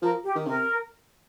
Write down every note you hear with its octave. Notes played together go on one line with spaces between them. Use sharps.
F3 A#4
G4
D#3
C3 A#4